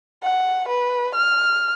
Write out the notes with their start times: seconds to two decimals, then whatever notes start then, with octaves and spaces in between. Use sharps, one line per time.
0.23 F#5
0.69 B4
1.15 F6